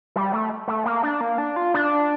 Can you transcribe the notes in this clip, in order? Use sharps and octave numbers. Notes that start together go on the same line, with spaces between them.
G3
A3
A3
A#3
D4
A#3
D4
F4
D4